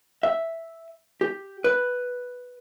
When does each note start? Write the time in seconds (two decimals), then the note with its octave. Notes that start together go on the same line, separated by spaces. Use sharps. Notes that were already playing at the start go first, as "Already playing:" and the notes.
0.23 E5
1.21 G4
1.64 B4